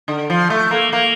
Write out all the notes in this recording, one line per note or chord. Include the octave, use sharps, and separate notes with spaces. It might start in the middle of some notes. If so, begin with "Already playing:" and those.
D3
F3
A3
A#3
A#3